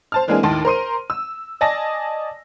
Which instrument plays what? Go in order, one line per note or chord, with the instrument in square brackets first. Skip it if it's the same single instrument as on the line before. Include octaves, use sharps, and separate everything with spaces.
[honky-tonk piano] C5 A5 F6
E3 G#3 A#3 C4 D4 G#4
D#2 A2 D#3 A5 C6
A#4 C5 C6 D#7
E6
D5 D#5 G#5 A5 A#6